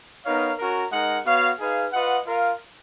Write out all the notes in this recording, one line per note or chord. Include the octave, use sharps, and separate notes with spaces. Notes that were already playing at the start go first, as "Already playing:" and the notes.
B3 D#4 A#4 C#5 F5
C#4 F#4 A#4
G#3 D#4 A#4 D#5 F#5
B3 F#4 C#5 F5
D#4 G#4 B4 F5
F4 B4 D#5 F#5
F4 A#4 F5